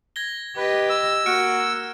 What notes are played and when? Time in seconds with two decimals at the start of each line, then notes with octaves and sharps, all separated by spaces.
0.16 G#6 A#6 G7
0.57 G4 B4 D#5
0.90 E6
1.26 A#3 F#4 F6 C#7 D7